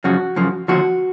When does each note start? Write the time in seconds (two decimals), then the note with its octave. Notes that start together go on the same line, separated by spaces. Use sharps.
0.04 F#2 C#3 F3 F#4
0.36 F#2 C#3 F3
0.68 D#2 D3 F3 F#4